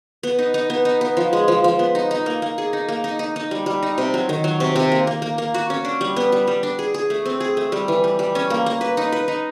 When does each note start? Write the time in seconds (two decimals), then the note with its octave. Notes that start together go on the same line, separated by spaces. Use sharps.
0.23 B3
0.39 D#4
0.54 D#4
0.70 B3
0.85 D#4
1.01 B3
1.17 F3
1.33 G#3
1.48 F3
1.64 F3
1.79 B3
1.95 D#4
2.11 D#4
2.26 A#3
2.42 A#3
2.58 G#4
2.73 D#4
2.88 A#3
3.04 D#4
3.19 D#4
3.36 D#4
3.51 G3
3.66 G3
3.83 D#4
3.98 C3
4.14 F#3
4.29 D#3
4.44 F#3
4.60 C3
4.76 C3
4.92 A#3
5.07 A#3
5.22 A#3
5.38 A#3
5.54 F#4
5.70 C#4
5.85 D4
6.01 G3
6.16 B3
6.32 G3
6.47 G3
6.63 D4
6.79 G#4
6.94 G#4
7.10 A3
7.25 C4
7.40 G#4
7.57 A3
7.72 G3
7.88 E3
8.04 G3
8.19 G3
8.35 C#4
8.50 A#3
8.66 A#3
8.81 B4
8.97 D#4
9.12 B4
9.28 D#4